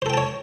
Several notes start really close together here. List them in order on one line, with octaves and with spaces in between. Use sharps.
C5 A4 G5 A5 C#5